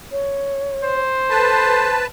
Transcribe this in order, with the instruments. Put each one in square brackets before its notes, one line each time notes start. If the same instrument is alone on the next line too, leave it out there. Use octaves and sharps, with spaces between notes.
[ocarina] C#5
[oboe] C5
[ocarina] A4 [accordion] B4 A5